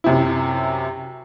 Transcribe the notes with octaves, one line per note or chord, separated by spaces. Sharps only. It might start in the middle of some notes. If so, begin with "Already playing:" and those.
F#2 C3 E4